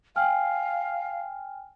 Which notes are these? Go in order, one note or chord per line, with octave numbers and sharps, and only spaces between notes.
F5 G5 G#5 F6